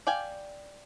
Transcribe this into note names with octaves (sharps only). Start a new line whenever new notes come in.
D5 F5 G5 G#5